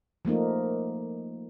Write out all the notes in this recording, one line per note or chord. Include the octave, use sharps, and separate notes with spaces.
F3 A3 A#3 D#4